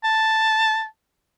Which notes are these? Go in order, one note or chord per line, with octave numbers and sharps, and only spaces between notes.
A5